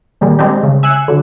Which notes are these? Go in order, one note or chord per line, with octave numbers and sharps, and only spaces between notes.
A#2 D#3 G3 G#3
G3 G#3 C4 D4 D#4 G4
C#3
E5 G#5 E6 F#6 C7 C#7
D3 F#3 D4